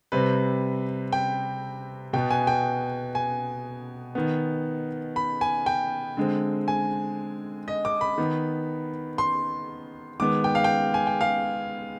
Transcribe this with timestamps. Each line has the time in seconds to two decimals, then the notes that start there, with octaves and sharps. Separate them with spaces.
0.12 C3 G3 C4 B4
1.13 G5
2.13 B2 B3 G5
2.30 G#5
2.47 G5
3.15 G#5
4.15 D#3 B3
5.16 B5
5.41 G#5
5.66 G5
6.17 D3 G#3 C4
6.68 G#5
7.68 D#5
7.85 D6
8.01 B5
8.18 D#3 B3
9.18 C6
10.20 D#3 G#3 B3 D6
10.44 G5
10.55 F5
10.64 G5
10.94 G#5
11.07 G5
11.21 F5